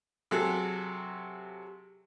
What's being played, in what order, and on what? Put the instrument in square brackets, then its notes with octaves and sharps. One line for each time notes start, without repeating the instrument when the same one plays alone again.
[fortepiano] C3 F#3 F#4 G#4 A4